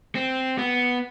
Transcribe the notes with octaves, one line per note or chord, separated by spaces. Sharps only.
C4
B3